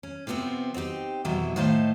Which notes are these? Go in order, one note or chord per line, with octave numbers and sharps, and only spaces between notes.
C#4
C3 F3 G3 B3 C4
C4 D#4 F4 G4
F2 B2 E3 F#3 E4
A2 D#3 C5 D#5 F5 A5